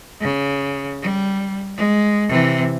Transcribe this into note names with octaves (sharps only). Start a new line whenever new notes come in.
C#3
G3
G#3
C3 E3